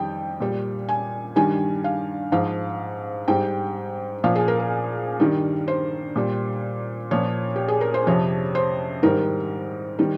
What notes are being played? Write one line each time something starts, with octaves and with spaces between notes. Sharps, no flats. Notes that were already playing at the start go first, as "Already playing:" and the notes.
Already playing: F2 D#3 G3 G5
A#2 G3
G#5
G2 D#3 G3 G#5
F5
G#2 F3 F5
G#2 G3 G5
A#2 F3 F5
G#4
A#4
A#4
G2 D#3 G3
C5
A#2 G3
A#2 F3 C#5
G4
G#4
A#4
C5
F2 C3 F3 C#5
C5
G#2 D#3 G3 A#4
D#3 G3